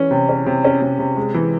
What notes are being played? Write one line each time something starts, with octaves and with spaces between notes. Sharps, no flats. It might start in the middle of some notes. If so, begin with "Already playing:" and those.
Already playing: E3 C#4
C3
C#4
C3
C#4
C3
C3
G#3
E3